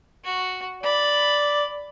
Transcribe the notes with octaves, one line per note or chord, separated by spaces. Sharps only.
F#4
D5 B5